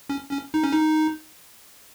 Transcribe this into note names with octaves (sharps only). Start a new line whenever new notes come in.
C#4
C#4
D#4
C#4
D#4